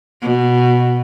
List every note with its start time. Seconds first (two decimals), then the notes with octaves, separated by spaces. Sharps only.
0.22 B2